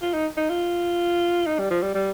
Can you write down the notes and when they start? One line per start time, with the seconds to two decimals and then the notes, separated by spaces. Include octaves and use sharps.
0.02 F4
0.13 D#4
0.37 D#4
0.50 F4
1.46 D#4
1.59 G3
1.70 F3
1.82 G3
1.94 G3